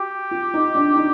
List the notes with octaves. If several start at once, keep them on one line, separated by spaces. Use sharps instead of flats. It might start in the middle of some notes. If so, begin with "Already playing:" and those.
Already playing: F#4 G4
F4
D#4
D4
D#4